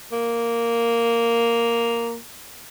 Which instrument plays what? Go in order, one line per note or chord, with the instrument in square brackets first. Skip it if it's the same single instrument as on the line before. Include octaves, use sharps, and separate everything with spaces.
[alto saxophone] A#3